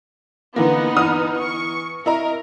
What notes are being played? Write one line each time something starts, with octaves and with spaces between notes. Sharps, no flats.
D3 E3 A#3 B3 D#4
E3 D#6 F6
C#6
E4 A#4 D#5 A#5